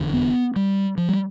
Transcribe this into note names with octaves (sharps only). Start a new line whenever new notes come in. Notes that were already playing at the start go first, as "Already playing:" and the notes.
Already playing: F1 E2 D3
B3
G3
F3
G3